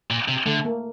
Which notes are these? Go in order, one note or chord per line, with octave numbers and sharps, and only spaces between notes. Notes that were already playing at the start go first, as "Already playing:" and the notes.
A#2
C3
D3 A3
A#3